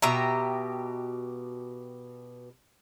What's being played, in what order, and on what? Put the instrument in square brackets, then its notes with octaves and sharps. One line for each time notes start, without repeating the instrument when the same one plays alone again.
[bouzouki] B2 G4 E5 A#5